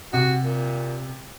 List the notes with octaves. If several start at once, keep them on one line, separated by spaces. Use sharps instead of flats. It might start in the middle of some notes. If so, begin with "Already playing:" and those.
C3 F#4
A#2